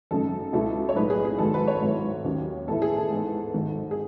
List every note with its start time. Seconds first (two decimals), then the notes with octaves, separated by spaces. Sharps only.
0.11 G#1 F#2 C#3 G#3 D#4 A4
0.53 C#2 B2 G#3 B3 E4 A4
0.89 C#5
0.96 B1 A2 G#3 B3 D#4 B4
1.10 G#4
1.25 G#4
1.38 G#1 G#2 D#3 F#3 B3 A4
1.54 B4
1.68 C#5
1.81 G#1 G#2 F#3 B3 E4
2.24 D#2 D#3 F#3 C#4
2.67 A2 E3 B3 E4 A4
2.82 G#4
2.97 A4
3.11 G#2 E3 B3 D#4
3.54 G#1 G#2 D#3
3.91 G#4